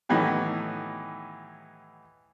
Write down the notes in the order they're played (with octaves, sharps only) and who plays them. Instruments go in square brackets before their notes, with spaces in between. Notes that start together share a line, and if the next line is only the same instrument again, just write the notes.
[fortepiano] A2 D#3 E3 F#3 B3 G4